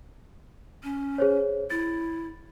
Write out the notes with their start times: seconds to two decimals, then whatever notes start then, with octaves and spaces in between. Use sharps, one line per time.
0.83 C#4
1.18 G#4 C5 C#5
1.70 E4 A6